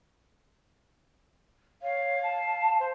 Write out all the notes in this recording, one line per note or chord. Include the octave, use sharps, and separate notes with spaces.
C#5 F5
A5
C5